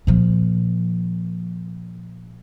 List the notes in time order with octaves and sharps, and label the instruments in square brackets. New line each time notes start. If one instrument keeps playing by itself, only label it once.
[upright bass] A#2 F3